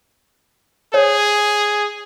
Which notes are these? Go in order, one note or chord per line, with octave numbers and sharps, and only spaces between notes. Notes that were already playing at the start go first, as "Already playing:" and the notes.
G#4 C#5